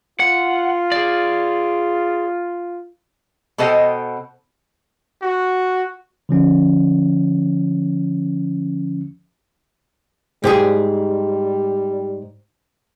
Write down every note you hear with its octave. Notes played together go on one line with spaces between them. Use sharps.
F4 F#5
G#4 D5
B2 B3 A4 C5 D#5 G5
F#4
D3 F3 C#4
G#2 G3 G4 G#4